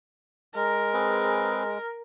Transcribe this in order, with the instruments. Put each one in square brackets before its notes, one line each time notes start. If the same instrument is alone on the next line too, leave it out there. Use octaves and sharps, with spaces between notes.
[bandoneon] G#3 [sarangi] A#4
[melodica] C4 G#4 B4